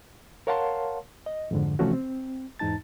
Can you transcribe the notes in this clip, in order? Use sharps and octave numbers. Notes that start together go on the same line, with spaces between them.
A#4 C#5 F5 F#5 A5 C6
D#5
F2 G#2 D3
C3 E3 F3 A3 C#4 F#4
C4
E2 G#2 D#4 A5 A6